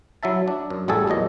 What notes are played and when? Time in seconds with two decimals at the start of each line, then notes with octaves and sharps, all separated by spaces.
0.23 F#3 E4 E5 A5
0.48 D4
0.70 F#2
0.88 A1 G3 F#4 G#4 A4
1.07 E2 A#2 F#3 D#5